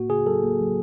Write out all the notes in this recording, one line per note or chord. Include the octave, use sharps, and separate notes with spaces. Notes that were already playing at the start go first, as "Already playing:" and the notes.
Already playing: A2 A#3 F#4
C#3 G#4
F#3 A4
A#3
F#3